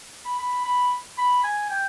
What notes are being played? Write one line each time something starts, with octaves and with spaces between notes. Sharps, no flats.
B5
B5
B5
B5
G#5
G5